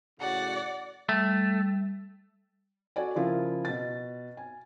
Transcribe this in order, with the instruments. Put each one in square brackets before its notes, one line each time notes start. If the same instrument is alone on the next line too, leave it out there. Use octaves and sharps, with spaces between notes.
[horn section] A2 C#3 F#4 [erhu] D5 [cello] F#5
[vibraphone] G3 [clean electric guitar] A3
[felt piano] F#4 A4 D5 G#5
C#3 F3 E4 F4 A#4
B2 A6
G#5